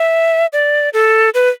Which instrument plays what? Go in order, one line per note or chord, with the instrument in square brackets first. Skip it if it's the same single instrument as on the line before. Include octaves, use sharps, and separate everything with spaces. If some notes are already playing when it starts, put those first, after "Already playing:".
Already playing: [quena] E5
D5
A4
B4